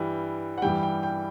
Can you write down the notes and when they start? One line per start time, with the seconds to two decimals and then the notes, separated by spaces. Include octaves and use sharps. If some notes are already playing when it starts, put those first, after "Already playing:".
Already playing: G2 E3 G3 G5
0.58 F#5
0.62 G2 E3 G3 G5
0.83 G5
1.03 G5